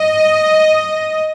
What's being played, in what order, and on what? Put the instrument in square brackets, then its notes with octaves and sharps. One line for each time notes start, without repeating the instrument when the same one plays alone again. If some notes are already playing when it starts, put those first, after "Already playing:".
Already playing: [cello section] D#5